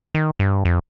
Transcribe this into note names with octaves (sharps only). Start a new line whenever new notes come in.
D#3
G2
F2